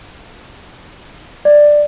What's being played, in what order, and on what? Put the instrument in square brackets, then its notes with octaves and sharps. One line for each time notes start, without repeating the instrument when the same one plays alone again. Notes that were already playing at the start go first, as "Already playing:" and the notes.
[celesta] D5